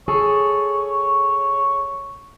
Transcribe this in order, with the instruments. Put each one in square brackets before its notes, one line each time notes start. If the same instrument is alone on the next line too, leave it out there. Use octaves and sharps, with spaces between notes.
[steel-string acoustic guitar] G#4 A4 [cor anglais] C#5